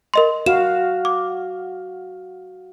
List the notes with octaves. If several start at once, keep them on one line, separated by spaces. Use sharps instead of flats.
A#4 D#5 C6
F#4 F5 E7
D6